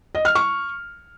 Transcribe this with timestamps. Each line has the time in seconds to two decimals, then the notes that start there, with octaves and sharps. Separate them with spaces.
0.15 D#5
0.25 F6
0.35 C#6